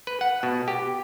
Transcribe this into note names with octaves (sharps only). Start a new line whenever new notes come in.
B4
F#5
B2
G4